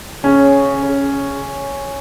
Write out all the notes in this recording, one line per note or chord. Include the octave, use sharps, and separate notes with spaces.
C#3 C#4
C#3